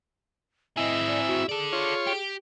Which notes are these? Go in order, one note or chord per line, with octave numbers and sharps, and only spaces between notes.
C4 E4 G#4 D#5 E5
D5
F#4
G#4 A4 D5
F4 C#5
G4